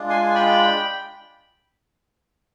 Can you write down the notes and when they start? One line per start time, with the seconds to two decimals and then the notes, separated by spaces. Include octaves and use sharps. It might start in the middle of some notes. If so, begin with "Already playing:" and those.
Already playing: G#3 D4 F4
0.10 G#5 C6
0.26 G#5
0.35 G5 B5